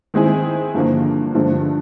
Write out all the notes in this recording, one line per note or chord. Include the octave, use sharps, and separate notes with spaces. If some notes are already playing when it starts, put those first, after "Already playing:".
D#3 G#3 C4 E4 G#4
G2 D3 F3 A#3
G2 D3 F3 G#3